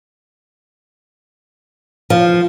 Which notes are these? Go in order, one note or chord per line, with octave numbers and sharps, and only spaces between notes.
F3